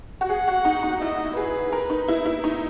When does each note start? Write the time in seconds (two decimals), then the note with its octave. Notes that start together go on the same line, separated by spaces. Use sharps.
0.21 F#4
0.30 G#4 F#5
0.48 F#4
0.65 D#4
0.83 D#4
1.01 E4 D#5
1.37 G#4 B4
1.73 A#4
1.90 D#4
2.08 E4
2.26 E4
2.44 D#4